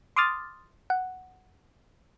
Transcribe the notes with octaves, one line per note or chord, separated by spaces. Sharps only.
C6 D6 D#6 F6 A6
F#5